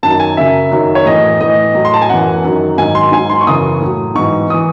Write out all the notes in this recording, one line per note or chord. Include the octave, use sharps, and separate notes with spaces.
F#2 D#3 F#3 A5
G#5
F#2 C#3 F#3 E5
F#2 D#3 F#3
C#5
A2 E3 D#5
A2 E3 D#5
A2 F#3
C6
A5
G#5
F#2 E3 F#5
F#2 D#3 F#3
G#2 D#3 F#3 G#5
C6
G#2 F#3 G#5
C6
C#6
F#2 C#3 E3 D#6
A2 F#3
G#2 E3 C#6
D#6
E3